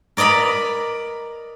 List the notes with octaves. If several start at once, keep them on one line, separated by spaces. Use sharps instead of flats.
A#4 D5 D#5 A#5 B5